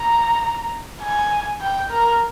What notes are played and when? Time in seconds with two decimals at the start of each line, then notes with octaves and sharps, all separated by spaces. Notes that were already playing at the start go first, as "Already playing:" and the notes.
Already playing: A#5
1.02 G#5
1.61 G5
1.90 A#4